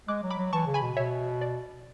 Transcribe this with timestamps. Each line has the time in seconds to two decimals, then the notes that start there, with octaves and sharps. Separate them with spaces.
0.08 G#3 D6 F#6
0.23 F#3
0.30 B5 D6
0.38 F#3
0.53 E3 A5 C#6
0.67 C#3
0.74 G#5 B5
0.82 B2
0.97 B2 C#5 E5
1.41 D5